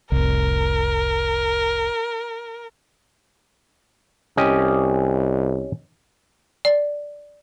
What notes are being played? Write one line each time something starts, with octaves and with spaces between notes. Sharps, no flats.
F1 C2 A#4
C2 C#4 G4 D#5
D5